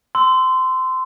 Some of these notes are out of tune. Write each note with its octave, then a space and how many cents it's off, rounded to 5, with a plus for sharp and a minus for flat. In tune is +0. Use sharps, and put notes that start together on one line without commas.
C6 -20 E6 +0